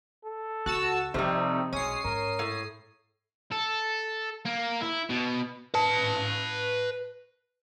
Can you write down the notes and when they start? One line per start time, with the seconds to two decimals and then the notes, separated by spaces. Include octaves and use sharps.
0.24 A4
0.66 C#2 F#4 A5 E6
1.14 C3 F3 G3 A3 D#4
1.73 B1 G#3 C#4 D#6 C7
2.04 G#2 A#4
2.39 A2
3.51 A4
4.46 A#3
4.82 E4
5.10 B2
5.74 B4 A5